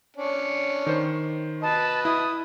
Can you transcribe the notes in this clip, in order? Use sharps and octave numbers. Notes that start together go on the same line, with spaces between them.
C#4 D4
D#3 C5
B4 D#5 A5 B5
E4 D#6